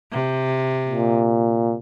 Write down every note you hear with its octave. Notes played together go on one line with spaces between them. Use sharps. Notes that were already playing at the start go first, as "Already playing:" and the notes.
C3
A#2